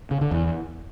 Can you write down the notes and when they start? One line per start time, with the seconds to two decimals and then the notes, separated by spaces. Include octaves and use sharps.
0.11 C#3
0.21 D3
0.31 E2